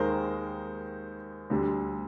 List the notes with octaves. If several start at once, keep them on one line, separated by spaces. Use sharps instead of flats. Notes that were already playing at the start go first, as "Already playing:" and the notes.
Already playing: D#2 D#3 G#3 A#4 C5
D2 D3 G3